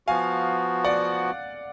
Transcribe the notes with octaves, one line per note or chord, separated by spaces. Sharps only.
F3 B3 F#4 F5 G#5
D5 F#5